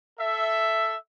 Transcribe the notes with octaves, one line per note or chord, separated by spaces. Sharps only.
A4 E5